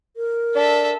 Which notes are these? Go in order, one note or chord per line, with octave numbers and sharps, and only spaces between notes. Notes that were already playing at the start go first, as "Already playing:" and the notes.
A#4
D4 A4 E5